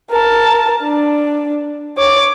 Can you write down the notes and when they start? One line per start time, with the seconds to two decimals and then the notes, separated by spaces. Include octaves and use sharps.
0.10 A#4 A5
0.83 D4
1.97 C#5 D6